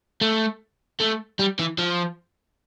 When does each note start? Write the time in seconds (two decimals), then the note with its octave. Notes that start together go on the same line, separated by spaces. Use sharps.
0.21 A3
1.00 A3
1.39 G3
1.59 E3
1.78 F3